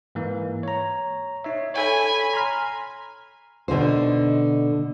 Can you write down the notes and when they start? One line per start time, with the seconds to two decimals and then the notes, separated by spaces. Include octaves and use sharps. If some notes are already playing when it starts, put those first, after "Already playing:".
0.15 G#2 E3 A#3
0.63 C#5 A#5
1.44 D#4 C#5 E5
1.74 A4 C#5 G#5 B5
2.33 A#5 C6 F6
3.68 B2 D3 D#4 C5